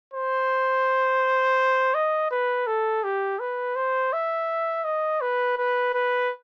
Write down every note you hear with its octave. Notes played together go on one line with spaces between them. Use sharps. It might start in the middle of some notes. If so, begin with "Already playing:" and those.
C5
D#5
B4
A4
G4
B4
C5
E5
D#5
B4
B4
B4